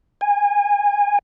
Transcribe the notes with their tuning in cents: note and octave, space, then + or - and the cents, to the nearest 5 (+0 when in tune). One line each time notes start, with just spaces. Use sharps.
G#5 -25